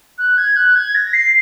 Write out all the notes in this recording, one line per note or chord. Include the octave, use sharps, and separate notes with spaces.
F#6
G#6
F#6
G#6
A#6
C7